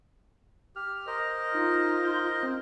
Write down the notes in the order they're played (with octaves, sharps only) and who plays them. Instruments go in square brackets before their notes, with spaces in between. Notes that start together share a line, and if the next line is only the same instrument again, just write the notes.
[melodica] G4 [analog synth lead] F6
[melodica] A#4 C5 D#5
[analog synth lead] D#4 [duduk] F4
[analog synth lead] G6
C4